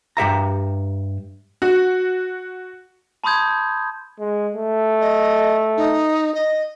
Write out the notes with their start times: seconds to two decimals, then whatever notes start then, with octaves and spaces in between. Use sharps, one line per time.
0.17 G2 G4 E5 A#5
1.62 F#4
3.24 A5 B5 C6 D#6 G6 G#6
4.19 G#3
4.54 A3
5.01 D#5
5.77 D#4
6.35 D#5